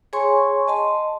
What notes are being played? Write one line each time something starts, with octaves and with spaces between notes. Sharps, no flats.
G#4 C#5 G#5 C6 C#6
D#5 A5 C6